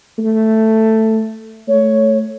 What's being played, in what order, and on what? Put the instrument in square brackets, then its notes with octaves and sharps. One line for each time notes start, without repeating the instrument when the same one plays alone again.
[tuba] A3
[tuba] A3 [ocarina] C#5